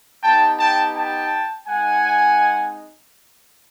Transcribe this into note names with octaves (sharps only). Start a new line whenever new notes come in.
B3 D#4 G4 G5 A5
G5 A5
G5 A5
G#3 C4 D#4 F#5 G#5